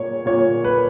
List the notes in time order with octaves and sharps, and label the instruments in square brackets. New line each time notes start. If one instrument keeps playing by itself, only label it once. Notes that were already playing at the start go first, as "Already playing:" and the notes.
Already playing: [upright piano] A#2 C#5
A#2 C#5
B4